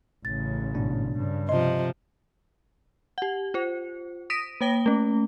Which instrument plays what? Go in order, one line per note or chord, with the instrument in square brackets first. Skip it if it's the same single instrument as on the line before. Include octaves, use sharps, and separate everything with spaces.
[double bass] A1 C#3 [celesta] A6
[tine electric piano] G#2 B2 D4
[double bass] G2 C#3
[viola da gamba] C3 F3 [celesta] D#5 [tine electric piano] C6
[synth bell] G4 F#5
F4 C5
D#6 A#6 B6 D7 D#7
A#3 C#5 G5 A#6 G7
A3 C#4